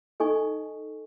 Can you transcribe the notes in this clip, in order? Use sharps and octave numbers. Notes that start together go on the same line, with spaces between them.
D#4 A4 D#5 G#5 C#6